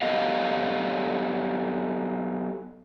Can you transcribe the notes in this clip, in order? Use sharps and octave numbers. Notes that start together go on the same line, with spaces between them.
F#3 B3 G4 A4 D#5 F5